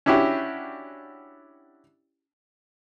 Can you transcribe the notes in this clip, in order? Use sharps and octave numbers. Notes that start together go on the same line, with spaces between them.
C#4 D4 E4 F#4 G4